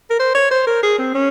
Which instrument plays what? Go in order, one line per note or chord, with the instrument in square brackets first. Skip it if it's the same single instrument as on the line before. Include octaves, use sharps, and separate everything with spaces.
[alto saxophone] A#4
C5
C#5
C5
A#4
G#4
C4
C#4